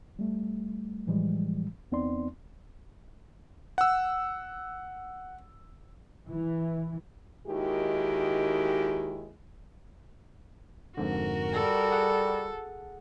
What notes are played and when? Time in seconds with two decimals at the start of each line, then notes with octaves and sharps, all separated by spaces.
0.19 G3 A3
1.07 A2 E3 F3 G3 G#3
1.92 E2 B3 C4 D#4 D5 C6
3.78 F#5 E6
6.29 E3
7.47 D#2 D#3 G#3 E4 F#4 G4
10.97 F2 G#2 D3 F#4 A#4
11.53 G3 A4
11.92 G#4 F#5